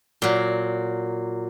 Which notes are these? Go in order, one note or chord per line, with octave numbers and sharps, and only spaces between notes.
A#2 F#3